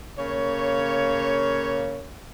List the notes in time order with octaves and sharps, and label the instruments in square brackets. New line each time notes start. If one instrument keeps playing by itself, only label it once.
[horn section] C#3 A#3 C#5